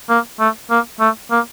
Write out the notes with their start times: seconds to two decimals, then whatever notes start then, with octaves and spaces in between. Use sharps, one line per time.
0.09 A#3
0.39 A3
0.70 A#3
1.00 A3
1.31 A#3